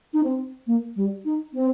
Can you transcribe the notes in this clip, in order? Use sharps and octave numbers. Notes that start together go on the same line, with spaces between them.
D#4
C4
A#3
G3
D#4
C4